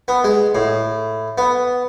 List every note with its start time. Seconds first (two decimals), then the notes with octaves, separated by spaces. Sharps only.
0.08 B3
0.24 G#3
0.55 A2
1.38 B3